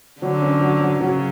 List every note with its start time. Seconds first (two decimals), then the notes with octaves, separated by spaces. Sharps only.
0.21 D3 F#3
0.42 C#4
0.61 F#3
0.80 F#3
1.01 C#3 F#3